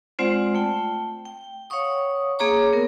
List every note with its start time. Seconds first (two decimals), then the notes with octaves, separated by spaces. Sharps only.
0.19 G#3 C4 F4 C5 D5 F#5
0.55 A3 G5
1.25 G5
1.70 C#5 F5 F#5 C#6 D#6
2.39 A#3 G#4 C#5 A#5 D6
2.73 B3 A#4